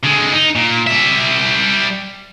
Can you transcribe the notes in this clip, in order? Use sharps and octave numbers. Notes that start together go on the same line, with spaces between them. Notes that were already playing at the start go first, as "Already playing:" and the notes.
D3 G#3
D#4
A#2
G3 E5